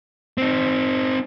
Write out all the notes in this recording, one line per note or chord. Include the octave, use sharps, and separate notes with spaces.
C4 D#4